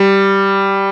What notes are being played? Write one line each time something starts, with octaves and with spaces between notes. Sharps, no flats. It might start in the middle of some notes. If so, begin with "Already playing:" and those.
Already playing: G3